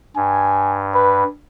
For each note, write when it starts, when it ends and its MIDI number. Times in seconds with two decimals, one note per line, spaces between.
0.16 1.24 43
0.16 0.77 80
0.94 1.26 71